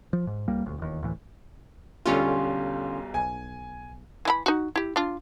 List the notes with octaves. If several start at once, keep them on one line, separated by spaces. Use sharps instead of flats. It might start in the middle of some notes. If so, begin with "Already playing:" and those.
F3
G#2
C#2 G3 A#3
D#1 D2
E1 D#2
D2 A2 E3
B1 E2 D3 G3 C#4 F4
B1 G#5
E3 E4 B5
D#4 F#4
E4 G4
D4 F4